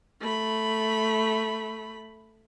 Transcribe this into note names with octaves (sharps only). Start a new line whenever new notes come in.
A3 B5